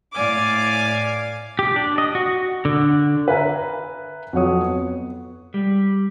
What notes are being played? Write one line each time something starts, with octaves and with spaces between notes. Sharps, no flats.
A2 D5 F5 G#5 D6
G4
D4
D#5
F#4
D3
B4 E5 F5 G#5 A#5
F2 F#3 F#4 C#5 D#6
B3
G3